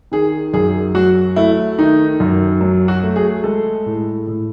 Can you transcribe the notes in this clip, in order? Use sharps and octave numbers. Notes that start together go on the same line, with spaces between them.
D#3 G#4
F#2 G#4
F#3 F#4
A3 E4
D#3 D#4
F#2
F#3
F#4
A3
G#4
G#3 A4
A2
A2